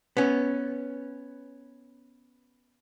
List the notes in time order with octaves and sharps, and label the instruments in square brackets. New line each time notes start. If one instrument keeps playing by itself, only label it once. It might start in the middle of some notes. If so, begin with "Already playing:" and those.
[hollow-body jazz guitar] B3 C#4